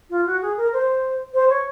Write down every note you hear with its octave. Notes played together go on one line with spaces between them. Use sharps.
F4
F#4
G#4
A#4
C5
C5
C#5